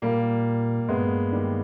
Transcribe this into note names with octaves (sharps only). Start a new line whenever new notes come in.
A#2 G3 A#3
G2 G#3 B3
D#3 G3